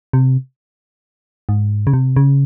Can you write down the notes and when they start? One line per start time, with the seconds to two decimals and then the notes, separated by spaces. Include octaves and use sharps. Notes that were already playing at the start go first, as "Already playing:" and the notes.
0.13 C3
1.49 G#2
1.87 C#3
1.93 C3
2.16 C#3